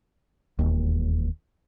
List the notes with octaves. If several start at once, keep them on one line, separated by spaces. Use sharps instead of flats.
E1 D#2